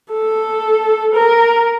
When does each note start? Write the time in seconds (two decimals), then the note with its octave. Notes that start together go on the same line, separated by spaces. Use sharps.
0.13 A4
1.15 A#4